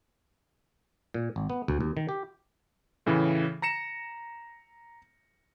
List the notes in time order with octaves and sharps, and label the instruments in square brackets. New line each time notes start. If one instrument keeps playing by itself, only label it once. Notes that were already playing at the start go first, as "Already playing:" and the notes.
[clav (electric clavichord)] A#2
G#1
B3
D2
D#2
D#3
G4
[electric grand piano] A2 C#3 E3
A#5 A#6 C#7 E7